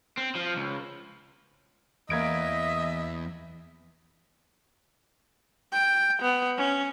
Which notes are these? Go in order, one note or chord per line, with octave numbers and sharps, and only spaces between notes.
C4
F3
C#2
E2 A#3 D#5 E5 G#6 D7
G5
B3
C#4